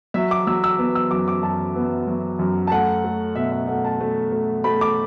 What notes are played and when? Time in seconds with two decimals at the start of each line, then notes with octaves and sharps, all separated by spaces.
0.14 F#3 E5
0.31 D6
0.47 F#3 E6
0.64 E6
0.79 B3
0.95 E6
1.11 F#2 D6
1.28 D6
1.43 F#2 A5
1.76 B3
2.07 F#3
2.39 F#2
2.67 A5
2.71 A3 F#5
3.04 A3
3.36 B2 E5
3.52 E5
3.68 A3 F#5
3.85 A5
4.00 A3
4.32 A3
4.64 A3 B5
4.81 D6